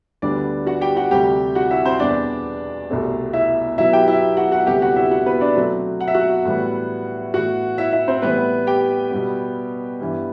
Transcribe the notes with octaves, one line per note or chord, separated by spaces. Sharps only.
D2 D3 G3 B3 D4 D5
F#4 F#5
G4 G5
F#4 F#5
D2 C3 G3 C4 G4 G5
F#4 F#5
E4 E5
C4 C5
E2 B2 G3 B3 D4 D5
C2 B2 A3 C4
E4 E5
B2 F#3 B3 E4 E5
G4 G5
E4 E5
F#4 F#5
F#4 F#5
D2 C3 G3 B3 G4 G5
F#4 F#5
E4 E5
F#4 F#5
B3 B4
D4 D5
B2 F#3 A3 C4
F#5
E5
F#4 F#5
A2 E3 G3 B3
A2 E3 B3 F#4 F#5
E4 E5
E4 E5
C4 C5
A2 E3 G3 B3 B4
G4 G5
B2 G3 B3
G2 E3 B3